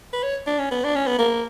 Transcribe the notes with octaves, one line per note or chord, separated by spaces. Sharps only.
B4
C#5
D4
C#4
B3
D4
C#4
B3
A#3